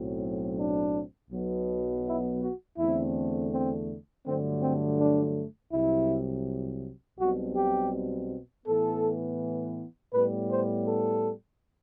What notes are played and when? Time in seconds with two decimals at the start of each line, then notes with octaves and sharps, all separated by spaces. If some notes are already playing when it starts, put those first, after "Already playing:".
Already playing: B1 A2 F#3 C4
0.58 D4
1.31 B1 B2 F#3 B3
2.05 E4
2.41 F#4
2.78 E2 D3 A3 C4 E4
3.53 C4
4.25 G2 D3 F#3 A3 C4
4.62 C4
5.00 D4
5.73 C2 C3 F#3 E4
7.19 B1 B2 G3 C4 F#4
7.57 G4
8.66 A2 E3 B3 A4
10.14 A2 G3 B3 B4
10.51 C5
10.87 A4